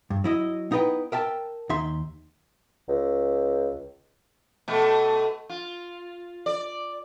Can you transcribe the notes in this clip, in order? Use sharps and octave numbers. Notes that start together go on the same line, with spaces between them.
G2
F#3 E4 D#5
B3 D#4 E4 A#4 B4 G5
A#4 E5 G5 A5
D#2 D#4 E5 C6
C#2
B2 A3
F4
D5